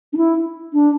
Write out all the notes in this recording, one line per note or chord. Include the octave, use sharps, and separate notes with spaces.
D4
E4
D4